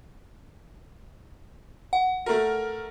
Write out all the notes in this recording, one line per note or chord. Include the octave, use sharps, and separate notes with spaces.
F#5
A3 A#4